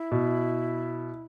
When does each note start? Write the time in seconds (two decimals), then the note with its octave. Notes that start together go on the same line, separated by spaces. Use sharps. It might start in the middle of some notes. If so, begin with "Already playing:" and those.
Already playing: E4
0.12 B2